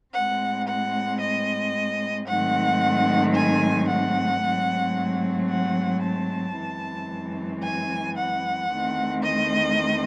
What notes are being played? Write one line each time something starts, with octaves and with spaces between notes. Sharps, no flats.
A2 G#3 C4 F#5
F#5
D#5
G#2 D#3 F#3 A3 C4 F#5
G#5
F#5
G#2 F#3 A3 C4
F#5
A5
F#2 E3 G#3 C4
G#5
F#5
E2 D#3 A3 C4
D#5